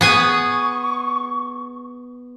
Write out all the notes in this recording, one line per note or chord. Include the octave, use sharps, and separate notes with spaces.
B3 G#4 G#5 C#6